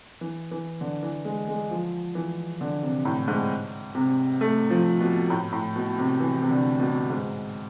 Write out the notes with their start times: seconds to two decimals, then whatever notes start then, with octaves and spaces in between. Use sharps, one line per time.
0.21 E3
0.51 E3
0.81 D3
1.03 E3
1.25 G#3
1.49 G#3
1.71 F3
2.15 E3
2.61 D3
2.83 C3
3.05 A2
3.28 G#2
3.95 C3
4.41 A3
4.70 F3
5.00 B2
5.30 A2
5.52 A2
5.76 B2
5.98 C3
6.20 E3
6.42 C3
6.50 D3
6.79 B2
7.10 G#2